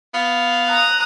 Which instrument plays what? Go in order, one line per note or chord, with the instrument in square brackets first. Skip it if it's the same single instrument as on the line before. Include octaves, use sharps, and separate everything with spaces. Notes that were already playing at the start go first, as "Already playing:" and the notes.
[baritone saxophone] B3 [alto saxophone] F5
[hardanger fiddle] A#5 D#6 [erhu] F#6